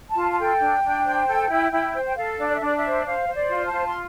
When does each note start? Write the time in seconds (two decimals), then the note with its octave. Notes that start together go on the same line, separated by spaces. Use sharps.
0.09 A5
0.16 F4
0.31 A5
0.38 A4 G5
0.61 D4
0.83 D4
1.06 C5
1.27 A4
1.50 E4
1.72 E4
1.94 C5
2.07 G5
2.17 A4 F5
2.39 D4
2.47 D5
2.55 E5
2.61 D4 D5
2.77 E5
2.83 C5
3.06 C5 F5
3.28 C5
3.35 D5
3.51 F4
3.65 A5
3.73 F4
3.87 C6